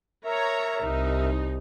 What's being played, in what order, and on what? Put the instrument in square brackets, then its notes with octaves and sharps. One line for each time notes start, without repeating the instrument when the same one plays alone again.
[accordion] A#4 E5 [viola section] C#5 A#5
[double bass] C2 [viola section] D#4